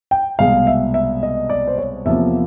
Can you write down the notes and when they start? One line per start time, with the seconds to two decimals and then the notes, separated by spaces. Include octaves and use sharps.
0.11 G5
0.39 C2 B2 G#3 F5
0.67 E5
0.94 E5
1.23 D#5
1.50 D5
1.68 C5
1.78 C#5
2.05 E2 C3 F3 A#3 E5